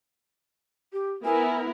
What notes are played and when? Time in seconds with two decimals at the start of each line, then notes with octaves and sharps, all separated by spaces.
0.93 G4
1.25 B3 E4 A#4 G#5